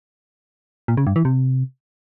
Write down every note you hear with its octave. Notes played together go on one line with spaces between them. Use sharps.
A#2
C#3
G2
E3
C3